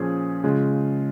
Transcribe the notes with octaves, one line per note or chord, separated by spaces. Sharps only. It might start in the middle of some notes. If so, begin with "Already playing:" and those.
Already playing: A#2 F3 C#4 G#4
C#3 G#3 F4